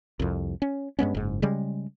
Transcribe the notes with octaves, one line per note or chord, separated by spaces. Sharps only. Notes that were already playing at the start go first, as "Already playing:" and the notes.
C2 F2
C#4
G2 G#3 B3 C#4
F#1 G#2
C#3 G3 G#3